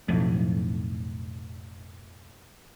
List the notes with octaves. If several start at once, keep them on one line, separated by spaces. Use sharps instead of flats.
B1 F2 A2